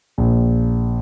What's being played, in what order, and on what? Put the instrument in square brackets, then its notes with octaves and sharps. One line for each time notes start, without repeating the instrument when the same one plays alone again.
[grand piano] A#1